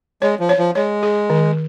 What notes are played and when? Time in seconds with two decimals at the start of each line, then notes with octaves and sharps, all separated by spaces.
0.22 G#3 C#5
0.40 F3
0.49 C#5
0.58 F3
0.75 G#3 C#5
1.03 G#4
1.30 D#3